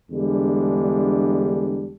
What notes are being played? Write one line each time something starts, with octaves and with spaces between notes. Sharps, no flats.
E2 D3 G3 G#3 D4